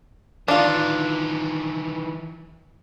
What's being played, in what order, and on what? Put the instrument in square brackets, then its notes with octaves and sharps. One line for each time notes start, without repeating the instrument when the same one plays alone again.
[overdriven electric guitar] D#3 E3 [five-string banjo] D4 F4